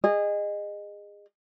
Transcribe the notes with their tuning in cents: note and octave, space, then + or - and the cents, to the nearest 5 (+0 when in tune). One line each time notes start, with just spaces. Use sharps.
G#4 -25 D#5 -20